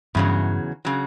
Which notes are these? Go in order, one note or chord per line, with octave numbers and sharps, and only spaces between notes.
E2 G2 C#3 F#3
C#3 F#3